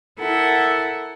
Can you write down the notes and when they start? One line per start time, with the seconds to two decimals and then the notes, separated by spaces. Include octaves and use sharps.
0.19 E4 A4 A#4 F#5